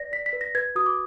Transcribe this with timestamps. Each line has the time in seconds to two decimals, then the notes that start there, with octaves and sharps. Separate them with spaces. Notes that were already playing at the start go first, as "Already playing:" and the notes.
Already playing: B4 D5 A#6
0.12 D5 B6
0.26 B6
0.33 B4
0.41 A#6
0.55 B4 G#6
0.75 F#4 D#6
0.86 D6